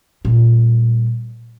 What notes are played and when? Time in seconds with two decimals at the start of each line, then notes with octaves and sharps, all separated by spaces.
0.25 A#2 G3